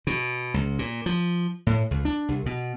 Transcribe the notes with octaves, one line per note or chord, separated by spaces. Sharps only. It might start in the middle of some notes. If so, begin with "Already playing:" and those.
B2
C#2
A#2
F3
A2
C#2
D4
C2
B2